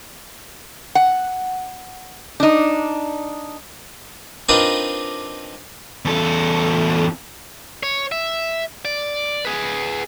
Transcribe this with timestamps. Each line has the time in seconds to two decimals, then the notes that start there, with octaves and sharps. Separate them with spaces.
0.95 F#5
2.40 D4 D#4
4.49 C4 D4 D#4 F4 A#4 B4
6.05 E2 A4
7.83 C#5
8.12 E5
8.85 D5
9.45 G#4 B4